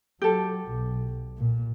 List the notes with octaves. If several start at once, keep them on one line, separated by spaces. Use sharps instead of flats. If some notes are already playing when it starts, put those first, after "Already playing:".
F#3 G4 A4
B1
A#2